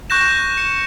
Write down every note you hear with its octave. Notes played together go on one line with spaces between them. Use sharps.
C#6 F#6 G6 A#6 E7
C#7